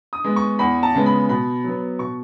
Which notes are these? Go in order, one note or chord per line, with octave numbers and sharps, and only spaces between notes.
D#6
G#3 B3
C#6
E2 B5
A5
C#3 G#3 B3
B5
B2 B5
F#3 B3
B2 C#6